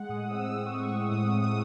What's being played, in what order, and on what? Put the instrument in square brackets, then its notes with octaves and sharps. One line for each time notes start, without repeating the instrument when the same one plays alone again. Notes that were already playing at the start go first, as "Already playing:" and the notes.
Already playing: [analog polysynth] G#3 F#5
A2 D#6
C4 E6
C4 D#6
C#6
A2
E6
A2
D#6
A2 D#6
D#6
A2
D#6